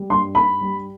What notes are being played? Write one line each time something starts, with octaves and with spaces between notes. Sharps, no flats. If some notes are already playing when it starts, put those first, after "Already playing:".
Already playing: G3
G2 C6
G2 B5
G3